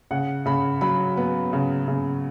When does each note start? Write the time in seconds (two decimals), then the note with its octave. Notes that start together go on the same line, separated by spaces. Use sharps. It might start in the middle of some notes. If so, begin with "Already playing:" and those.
0.11 C#3 F#5
0.46 C#3 B5
0.81 F#3 B5
1.17 B3
1.53 C#3
1.88 C#3